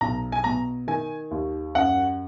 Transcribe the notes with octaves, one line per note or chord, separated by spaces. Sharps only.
B1 A#5
G#5
B2 A#5
D#3 G#5
D#2
F#2 F#5